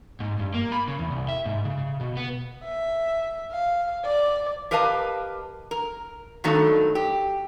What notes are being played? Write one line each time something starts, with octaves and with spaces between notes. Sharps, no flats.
G#2
G2
A#3
B5
C#3
E2
C2
E5
G#2
C#3
B2
B3
E5
F5
D5
G4 A#4 B4 D#5 F5 A5
A#4
G2 D#3 F#3 A3 D#4 A4
G4